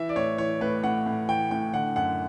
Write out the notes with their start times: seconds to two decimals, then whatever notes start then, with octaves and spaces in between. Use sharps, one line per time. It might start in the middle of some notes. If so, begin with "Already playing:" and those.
Already playing: E3 E5
0.09 D5
0.16 A2 C#5
0.38 E3 C#5
0.61 A2 B4
0.83 A2 F#5
1.06 A2
1.29 E3 G5
1.51 A2 G5
1.73 D3 F#5
1.96 F#2 F#5